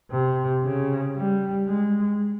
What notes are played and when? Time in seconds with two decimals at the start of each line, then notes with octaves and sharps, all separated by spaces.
0.11 C3
0.64 C#3
1.16 G3
1.67 G#3